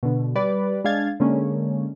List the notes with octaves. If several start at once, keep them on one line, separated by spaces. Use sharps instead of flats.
B2 D3
G3 G4 B4 D5
G#3 D4 F5 G#6 A6
D3 G#3 A#3 C#4